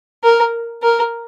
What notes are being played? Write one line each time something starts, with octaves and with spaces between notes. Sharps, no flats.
A#4
A#4